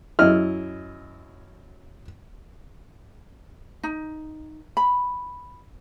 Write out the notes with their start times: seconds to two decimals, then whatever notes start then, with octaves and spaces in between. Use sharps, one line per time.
0.19 F#2 E4 D#5 F6
3.83 D#4
4.77 B5